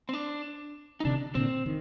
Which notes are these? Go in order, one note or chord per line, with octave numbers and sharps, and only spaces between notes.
C4
D4
D#4
C3 D#3 D4
A#2 D3 C4
D#3